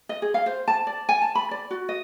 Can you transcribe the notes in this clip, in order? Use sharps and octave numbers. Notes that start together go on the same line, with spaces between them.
D#5
G#4
F5
C5
A5
D5
G#5
A5
B5
D5
F#4
D#5